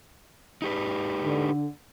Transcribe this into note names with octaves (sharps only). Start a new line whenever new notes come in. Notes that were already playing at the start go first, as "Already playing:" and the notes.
D#4 G4 B4
D3